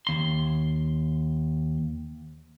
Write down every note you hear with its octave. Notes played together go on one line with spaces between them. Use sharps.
D#2 C6